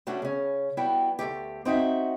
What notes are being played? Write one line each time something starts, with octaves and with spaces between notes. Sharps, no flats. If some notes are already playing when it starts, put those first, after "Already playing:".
G3 A3 C#4 D4 F#4
C#3 C#4
G3 B3 E4 F#4 G5
D2 B2 A3 G4
C4 D#4 F#4 E5